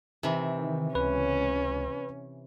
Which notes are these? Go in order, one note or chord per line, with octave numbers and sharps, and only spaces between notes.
C3 D#3 E3
C#2 C#4 B4